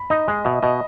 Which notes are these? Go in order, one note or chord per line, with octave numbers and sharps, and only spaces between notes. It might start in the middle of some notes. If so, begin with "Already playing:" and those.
Already playing: B5
D#4 D#5
G#3 D#5
B2 E5
B2 D#5